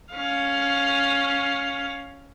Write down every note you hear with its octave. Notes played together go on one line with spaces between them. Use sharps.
C#4 F5